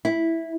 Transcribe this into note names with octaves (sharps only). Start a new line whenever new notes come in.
E4